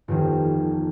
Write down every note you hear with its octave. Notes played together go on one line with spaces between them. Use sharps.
G1 F2 D#3